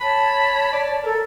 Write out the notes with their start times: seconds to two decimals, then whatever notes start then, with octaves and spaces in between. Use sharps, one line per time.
0.01 C#5 A5 B5
0.73 D5
1.03 A4 A#4